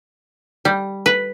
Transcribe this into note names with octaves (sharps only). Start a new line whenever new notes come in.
G3
B4